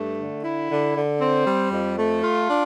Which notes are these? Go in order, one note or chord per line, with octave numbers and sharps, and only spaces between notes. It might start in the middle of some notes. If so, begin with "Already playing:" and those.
Already playing: G2 A3
D3
E4
D3
D3
C4
G3
F2
A3
F4
D4